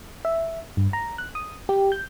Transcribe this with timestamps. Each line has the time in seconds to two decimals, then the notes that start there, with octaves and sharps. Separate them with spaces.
0.25 E5
0.77 G2
0.93 A#5
1.18 F#6
1.35 D#6
1.69 G4
1.92 G6